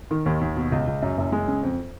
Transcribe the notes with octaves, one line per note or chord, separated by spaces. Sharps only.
D#3
D#2
D#2
B2
C#2
C#2
F#2
F#1
G#3
C#3
F2